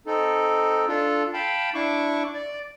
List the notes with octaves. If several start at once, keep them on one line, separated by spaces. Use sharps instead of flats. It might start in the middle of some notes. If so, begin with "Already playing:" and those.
C4 D#4 A4
D4 F4 A4
F5 G5 A5 B5
D4 E4 C#6 D6
D5